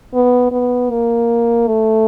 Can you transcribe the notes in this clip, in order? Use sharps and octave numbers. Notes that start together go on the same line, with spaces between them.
B3
B3
A#3
A3